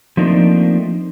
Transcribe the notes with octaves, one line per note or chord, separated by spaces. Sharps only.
F3 A3 A#3 C4 D4 D#4